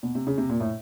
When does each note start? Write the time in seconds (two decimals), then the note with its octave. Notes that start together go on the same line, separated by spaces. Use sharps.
0.03 B2
0.15 C3
0.27 C#3
0.38 C3
0.49 A#2
0.60 A2